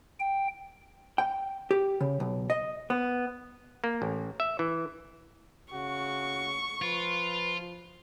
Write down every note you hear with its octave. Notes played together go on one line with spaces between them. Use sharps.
G5
G5
G4
C#3
B1
D#5
B3
A#3
A1
E5
E3
C#3 F#4 C#6
F3 F4 B4